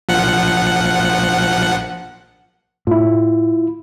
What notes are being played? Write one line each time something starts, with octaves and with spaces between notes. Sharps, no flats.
A#1 F3 F#5
A2 E4 F4